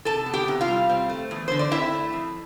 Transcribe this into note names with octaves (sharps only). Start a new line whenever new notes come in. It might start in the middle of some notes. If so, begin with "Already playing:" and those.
C3 A4 A5
B3
G4 G5
C3
F4 F5
G3
C4
A3
E2
D3 C5
D5
C4 E4 E5
A3
F2